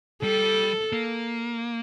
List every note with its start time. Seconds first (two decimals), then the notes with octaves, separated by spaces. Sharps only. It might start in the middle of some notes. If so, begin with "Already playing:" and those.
0.23 G3 A4
0.92 A#3